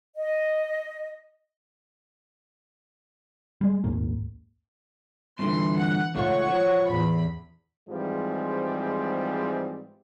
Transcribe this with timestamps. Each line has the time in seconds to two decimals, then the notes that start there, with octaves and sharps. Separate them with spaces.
0.17 D#5
3.61 G3 G#3
3.84 A#1 D#2 G#2 A#3
5.39 G2 A#2 D3 E3 C6
5.77 F#5
6.15 C#2 A3 F4 C#5 F#5 C#6
6.49 F3
6.87 A1 E2 B5
7.89 G#2 E3 F3 G3 G#3 C4